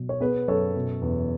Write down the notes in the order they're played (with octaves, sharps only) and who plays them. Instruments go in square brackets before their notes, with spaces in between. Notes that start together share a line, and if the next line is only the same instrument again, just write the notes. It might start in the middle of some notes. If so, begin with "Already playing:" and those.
Already playing: [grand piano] B2 F#3
C#5
B3 G#4 B4
F#2 A4 C#5
B2
E2